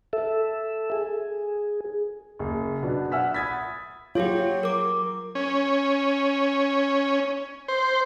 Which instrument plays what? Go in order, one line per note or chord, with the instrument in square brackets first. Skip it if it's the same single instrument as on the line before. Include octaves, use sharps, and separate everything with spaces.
[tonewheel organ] A4 E5
G#4
[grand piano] F#1
B2 F#3 B3 D4
E5 F#5 G#5 E6 F6 B6
B5 D#6 G#6 A6 B6
[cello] F#3 [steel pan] F4 [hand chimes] G4 G#4 C#5
[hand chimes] A#4 D6
[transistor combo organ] C#4
C5